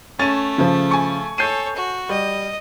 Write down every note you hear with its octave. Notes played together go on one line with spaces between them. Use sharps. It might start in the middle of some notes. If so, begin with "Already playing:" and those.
A3 C#4 A6 D#7
C#3 F3
G#5 C#6
A4 C#5 G6 C7 D#7
F#4
G3 D#5